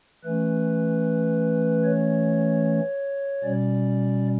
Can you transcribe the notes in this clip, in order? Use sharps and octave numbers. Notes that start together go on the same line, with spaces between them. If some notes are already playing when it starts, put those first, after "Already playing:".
E3 A3 C#4 B4
C#5
B2 G3 C#4 D5